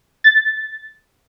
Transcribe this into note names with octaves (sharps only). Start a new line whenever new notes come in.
A6